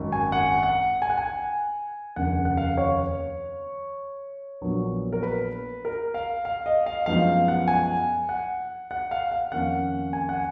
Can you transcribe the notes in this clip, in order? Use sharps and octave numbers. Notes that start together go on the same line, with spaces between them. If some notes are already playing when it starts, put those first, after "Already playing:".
Already playing: G#1 F#2 D#3 F#3
G#5
F#5
F#5
G#5
F#5
G#5
F1 D#2 C#3 F#5
F#5
F5
C#5
A#1 A#2 F#3 B3
A#4
B4
A#4
F5
F5
D#5
F5
F#2 F3 G#3 B3 D#4 F5
F#5
G#5
F#5
F#5
F5
F5
F2 D#3 A#3 C#4 F#5
G#5
F#5